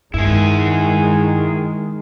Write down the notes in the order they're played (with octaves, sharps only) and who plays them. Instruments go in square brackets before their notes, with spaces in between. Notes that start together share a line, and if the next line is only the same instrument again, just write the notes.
[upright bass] G2 [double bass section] D#3 G#3 [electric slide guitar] E4 G#4